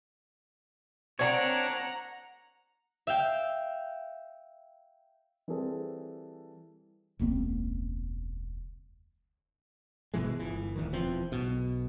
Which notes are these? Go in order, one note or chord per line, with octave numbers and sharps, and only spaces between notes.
C4 D4 A#4 C#5 F#5 A#5
E5 F5 G5
E3 G3 C4 G#4 A4
E1 C#2 A#3 C4
G#1 B2 E3 G#3
G1 E3
D#1 D2 D#3
E1 E3 F3 C4
B1 B2